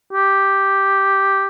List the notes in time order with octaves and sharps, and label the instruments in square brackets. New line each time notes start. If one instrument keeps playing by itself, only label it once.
[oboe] G4